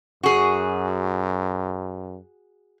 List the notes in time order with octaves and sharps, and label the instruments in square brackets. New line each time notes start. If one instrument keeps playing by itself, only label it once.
[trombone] F#2 [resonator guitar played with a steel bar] F#4 G#4